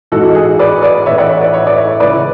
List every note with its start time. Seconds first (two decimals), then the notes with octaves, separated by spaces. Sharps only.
0.12 A1 G#2 E3 F#4 A4
0.35 G#4
0.59 B4 D5
0.82 B4 D5
1.06 A1 A2 E3 C#5 E5
1.18 D5 F#5
1.29 C#5 E5
1.41 B4 D5
1.53 C#5 E5
1.67 D5
1.77 C#5 E5
2.00 C#2 C#3 E3 B4 D5